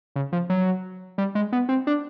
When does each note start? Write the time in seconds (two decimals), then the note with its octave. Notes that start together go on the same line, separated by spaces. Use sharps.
0.16 C#3
0.33 F3
0.50 F#3
1.18 G3
1.35 G#3
1.52 B3
1.69 C4
1.87 D4